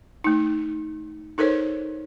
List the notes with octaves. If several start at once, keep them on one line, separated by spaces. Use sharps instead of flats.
A3 D#4
D#4 A4 A#4 C5 C#5